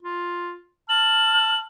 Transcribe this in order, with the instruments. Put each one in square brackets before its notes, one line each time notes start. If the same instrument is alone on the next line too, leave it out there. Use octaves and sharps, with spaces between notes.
[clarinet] F4
[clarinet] A5 [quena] F6 [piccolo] F#7